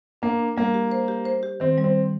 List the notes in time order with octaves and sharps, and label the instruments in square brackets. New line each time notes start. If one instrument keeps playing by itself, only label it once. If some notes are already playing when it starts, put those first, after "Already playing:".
[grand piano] A#3 [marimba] D4
[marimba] D4
[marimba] G3 [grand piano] A#3
[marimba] G4
C5
G4
C5
G4
[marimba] D#3 [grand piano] C4
[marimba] G3
[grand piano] C4